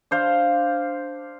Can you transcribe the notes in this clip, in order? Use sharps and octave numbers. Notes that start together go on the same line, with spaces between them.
D4 C5 F5